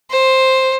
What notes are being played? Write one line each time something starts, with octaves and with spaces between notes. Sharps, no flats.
C5